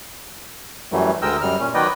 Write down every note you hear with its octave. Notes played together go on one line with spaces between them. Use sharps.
F#2 E3 F#3 G3 A3
D2 G#3 A#4 D#5 G5 E6
F#2 G3 F6
A#2 C#4
D#3 F#3 B4 D5 D#5 G5